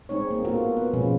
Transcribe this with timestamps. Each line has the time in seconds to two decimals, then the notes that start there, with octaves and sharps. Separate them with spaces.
0.09 G#3 C4 D#4 C#5
0.31 A#3
0.45 A#3 B3 F4 F#4 A4 A#4
0.77 B3 B4
0.93 B2 F3 G#3 C#4 F4